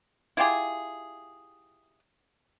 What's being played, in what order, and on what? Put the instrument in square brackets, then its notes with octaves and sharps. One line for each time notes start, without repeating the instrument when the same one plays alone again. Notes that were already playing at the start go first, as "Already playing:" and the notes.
[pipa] E4 F4 G4 G#4